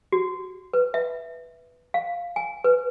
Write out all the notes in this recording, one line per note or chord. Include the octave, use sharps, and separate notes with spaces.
F#4
B4
E5
F5
G#5
B4